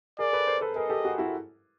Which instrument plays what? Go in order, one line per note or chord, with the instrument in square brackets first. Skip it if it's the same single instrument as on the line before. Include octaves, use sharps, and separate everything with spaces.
[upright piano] G#4 A#4 [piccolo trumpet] D5
[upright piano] A4 B4
A#4 C5
A4 B4
[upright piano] G#4 A#4 [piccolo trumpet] D#5
[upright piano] G4 A4
F#4 G#4
E4 F#4